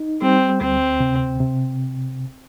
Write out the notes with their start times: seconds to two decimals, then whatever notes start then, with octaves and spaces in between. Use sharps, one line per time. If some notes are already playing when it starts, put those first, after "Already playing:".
Already playing: D#4
0.22 G3 C4
0.61 D2 C4
1.00 C3
1.40 C3